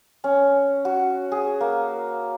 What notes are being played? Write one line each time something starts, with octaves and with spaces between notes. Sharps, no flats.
C#4
F#4
G#4
A#3